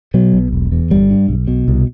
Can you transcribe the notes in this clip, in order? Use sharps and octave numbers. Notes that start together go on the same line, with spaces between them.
B2 F#3
B1
E1
E2
G1 G3
G2
B1
B2
C2